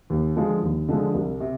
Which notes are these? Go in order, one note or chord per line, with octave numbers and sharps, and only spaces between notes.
D#2
D3 F3 G#3
D#2
D3 F3 G#3
C2
C3